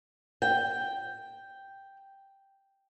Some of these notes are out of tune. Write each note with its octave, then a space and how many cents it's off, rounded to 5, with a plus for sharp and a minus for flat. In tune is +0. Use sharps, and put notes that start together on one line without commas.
G5 +0